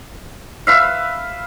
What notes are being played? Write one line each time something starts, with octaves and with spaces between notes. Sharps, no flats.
B4 E5 F5